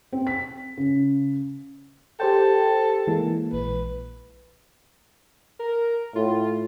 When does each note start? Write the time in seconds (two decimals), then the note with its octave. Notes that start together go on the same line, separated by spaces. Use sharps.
0.13 C4
0.27 B6
0.78 C#3
2.20 G4 A4 C5 G5
3.07 E3 G#3 A#3
3.53 A#1 B4
5.59 A#4
6.16 A2 F4